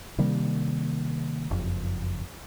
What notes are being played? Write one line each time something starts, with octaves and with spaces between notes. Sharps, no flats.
C3 D#3 G3 A#3
F#1 F2